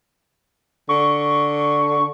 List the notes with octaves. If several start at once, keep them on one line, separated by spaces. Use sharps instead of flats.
D3 C#6